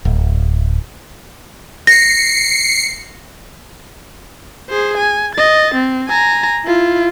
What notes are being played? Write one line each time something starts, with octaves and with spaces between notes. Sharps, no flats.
D1
A#6 C7 C#7
G#4 C5
G#5
D#5 A6
C4
G#5 A#5
E4 F4